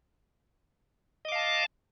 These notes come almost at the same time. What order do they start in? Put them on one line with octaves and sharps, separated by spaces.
D#5 D6 F5 A5